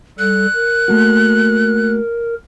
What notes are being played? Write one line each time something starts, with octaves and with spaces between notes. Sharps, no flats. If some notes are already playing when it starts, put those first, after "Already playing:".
G3 A4 F#6
A#4
A3 A#3 F#4